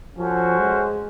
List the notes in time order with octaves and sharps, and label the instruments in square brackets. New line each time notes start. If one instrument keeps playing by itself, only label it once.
[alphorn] F3 [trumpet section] C#4 F#4 A4 C5
[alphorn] G#3